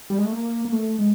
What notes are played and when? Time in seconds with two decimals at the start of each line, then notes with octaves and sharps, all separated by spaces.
0.10 G3
0.18 G#3
0.25 A3
0.32 A#3
0.65 A#3
0.72 A3
0.99 G#3